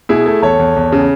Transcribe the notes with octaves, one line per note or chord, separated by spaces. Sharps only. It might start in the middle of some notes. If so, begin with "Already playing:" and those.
B2 E4 G#4
A3
E2 A4 C#5
E2
E2
C#3